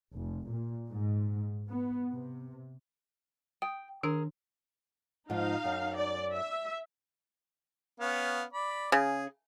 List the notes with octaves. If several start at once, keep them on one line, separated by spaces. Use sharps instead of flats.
F1
A#2
G#2
B3
C3
G5 D#6
D#3 D4 G#4 A#4
G#2 F3 D#4 F5
F#2
D5
E5
B3 C#4 F5
D5 B5
C#3 G#4